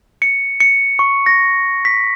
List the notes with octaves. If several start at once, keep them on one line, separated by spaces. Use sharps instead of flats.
C#7
C#7
C#6
A#6
B6